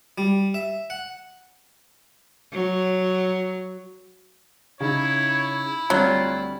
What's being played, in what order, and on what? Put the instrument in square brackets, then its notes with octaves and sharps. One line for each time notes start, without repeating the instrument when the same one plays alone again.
[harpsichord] G3
E5
F#5
[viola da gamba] F#3
[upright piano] C#3 D#4 [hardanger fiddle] E4 [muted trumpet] C#5
[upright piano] D2 G3 C4 [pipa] F#3 [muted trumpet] F4